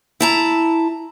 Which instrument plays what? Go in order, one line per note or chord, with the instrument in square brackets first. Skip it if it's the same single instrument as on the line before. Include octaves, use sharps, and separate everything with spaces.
[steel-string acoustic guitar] E4 A5 A#5